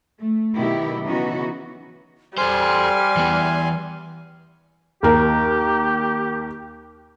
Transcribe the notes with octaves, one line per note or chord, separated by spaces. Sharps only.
A3
B2 D#3 F#3 B3 E4 G4
C#3 E3 B3 C#4 D#4 F#4
G3 A4 C5 G#5 C6 F6
E3 B3
D#2 G4 A#4